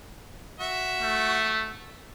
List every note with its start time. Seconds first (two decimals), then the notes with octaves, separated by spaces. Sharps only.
0.60 F#4 E5
1.01 A3